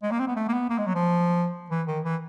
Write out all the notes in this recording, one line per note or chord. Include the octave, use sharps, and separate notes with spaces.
G#3
A#3
C4
B3
A3
A#3
B3
A#3
G#3
F#3
F3
E3
D#3
E3